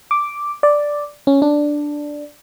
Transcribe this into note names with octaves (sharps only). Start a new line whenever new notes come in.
D6
D5
C#4
D4